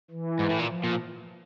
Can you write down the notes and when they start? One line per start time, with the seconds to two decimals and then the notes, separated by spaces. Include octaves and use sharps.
0.11 E3
0.39 G#2
0.50 A2
0.59 A#2
0.69 F3
0.84 A#2